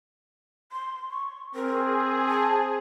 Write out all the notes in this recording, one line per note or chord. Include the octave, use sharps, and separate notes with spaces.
C6
C#6
C4 G#4 A#4
A5